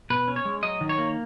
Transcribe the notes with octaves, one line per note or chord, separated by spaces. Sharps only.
B2 B4
C#4
C#5
G#3
F#3 D#5
D#3
C#5
A#3